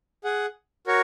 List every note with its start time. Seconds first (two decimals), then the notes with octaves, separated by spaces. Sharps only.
0.24 G#4 F#5
0.87 F#4 A#4 C#5